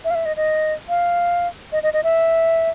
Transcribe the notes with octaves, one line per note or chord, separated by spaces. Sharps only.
E5
F5
E5
D#5
D#5
F5
D#5
D#5
D#5
E5